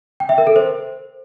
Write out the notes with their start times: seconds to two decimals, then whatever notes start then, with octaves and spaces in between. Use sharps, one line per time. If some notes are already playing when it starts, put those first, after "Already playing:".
0.20 G5
0.29 E5
0.38 A#4
0.47 A4
0.56 C5